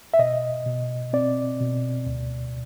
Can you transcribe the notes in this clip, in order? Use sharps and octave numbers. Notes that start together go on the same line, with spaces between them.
E5
B2 D#5
B2
C4 D5
B2
D2